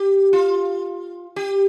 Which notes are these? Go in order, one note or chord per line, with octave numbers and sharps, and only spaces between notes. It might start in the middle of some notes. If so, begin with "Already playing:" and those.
Already playing: G4
F4
G4